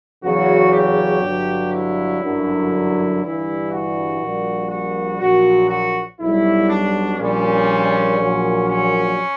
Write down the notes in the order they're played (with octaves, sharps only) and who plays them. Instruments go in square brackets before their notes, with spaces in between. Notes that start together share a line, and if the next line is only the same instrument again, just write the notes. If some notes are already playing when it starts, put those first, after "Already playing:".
[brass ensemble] E2 C#3 F#3 F#4
G4
G1 G2 F#3
E4
G1 F#2 D3 F#3
G1 G2 E3 G3 E4
F#4
A#1 A#2 G3
F#4
A#1 A#2 F#3 F#4
F#4
B1 B2 G3 E4
D4
A#1 A#2 G3 C#4
A#1 A#2 F#3
C#4